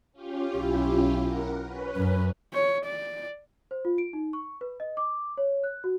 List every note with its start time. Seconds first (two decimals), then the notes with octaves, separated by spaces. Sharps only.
0.13 C#4 F4 G4
0.57 B1 E4
1.22 A#4 F#5
1.61 C#4 B4
1.97 F#2
2.53 C#5
2.84 D5
3.71 C5
3.85 F4
3.98 D7
4.13 D#4
4.33 C#6
4.61 B4
4.80 D#5
4.97 D6
5.37 C#5
5.64 F#6
5.84 F#4